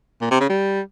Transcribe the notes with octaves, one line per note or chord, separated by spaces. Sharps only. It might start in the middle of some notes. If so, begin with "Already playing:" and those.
A#2
C3
C#3
G3